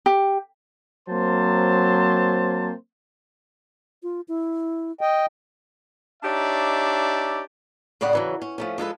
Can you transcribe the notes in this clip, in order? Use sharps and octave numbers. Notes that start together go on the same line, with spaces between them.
G4
F#3 A#3 C4 C5 A5 C6
F4
E4
D#5 G5
D4 D#4 G4 C#5 D5 E5
A2 C#3 C4 D5 D#5 F#5
C#3 E3 F#3
C#4
F3 A3 C#4
F3 G#3 A4 B4